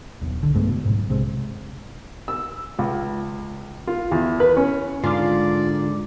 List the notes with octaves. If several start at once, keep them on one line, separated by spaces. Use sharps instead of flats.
D#1 B1
D3
G2 G#3 A3 B3
B2
B1 G#2
C3 G#3 C4
E6
C#2
F4
E2
B4
C#4
G#2 D3 F4 D5 D6